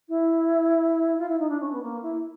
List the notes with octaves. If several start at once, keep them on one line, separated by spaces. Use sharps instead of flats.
E4
F4
E4
D#4
D4
C#4
B3
A#3
E4